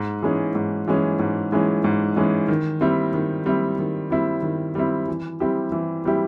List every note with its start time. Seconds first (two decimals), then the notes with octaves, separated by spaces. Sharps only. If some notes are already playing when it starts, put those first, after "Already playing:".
Already playing: G#2
0.23 E3 G#3 C#4
0.55 G#2
0.88 E3 G#3 C#4
1.19 G#2
1.52 E3 G#3 C#4
1.84 G#2
2.16 E3 G#3 C#4
2.48 D#3
2.81 G3 C4 E4
3.14 D#3
3.46 G3 C4 E4
3.79 D#3
4.10 G3 C4 E4
4.43 D#3
4.75 G3 C4 E4
5.08 E3
5.40 G3 C4 E4 G4
5.72 E3
6.05 G3 C4 E4 G4